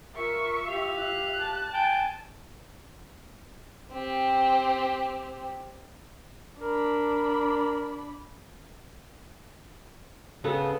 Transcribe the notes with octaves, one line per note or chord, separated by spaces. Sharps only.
F4 A#4 E5 C#6
G4 F5
F#6
A5
G5 G#5
C4 G4
D4 A#4 B5
C#3 B3 A4